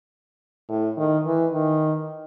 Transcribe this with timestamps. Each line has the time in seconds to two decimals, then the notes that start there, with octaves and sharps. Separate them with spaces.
0.69 A2
0.98 D#3
1.26 E3
1.54 D#3